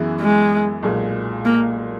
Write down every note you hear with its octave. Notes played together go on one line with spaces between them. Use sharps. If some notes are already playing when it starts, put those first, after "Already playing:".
Already playing: F#2 E3 B3 E4 G#4
G#3
B1 A#2 G#3
A#3